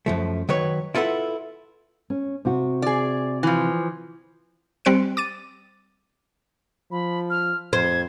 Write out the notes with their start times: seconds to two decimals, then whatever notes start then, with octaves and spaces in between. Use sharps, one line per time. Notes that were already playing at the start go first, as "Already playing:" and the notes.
0.06 F#2 F3 A3
0.49 D#3 F#3 B4 C#5
0.95 E4 F4 A4 B4 F#5
2.10 C#4
2.45 C3 F#4
2.82 G#4 D5
3.43 E3 F3
4.85 G3 C4 C5 F#6 C#7 D7
5.17 D6 A6 D#7
6.91 F3 B5
7.30 F6
7.73 F2 C5 G#6